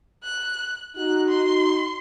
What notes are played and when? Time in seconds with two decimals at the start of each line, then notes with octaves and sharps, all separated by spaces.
0.23 F#6
0.95 D#4 F#4 F#6
1.28 C6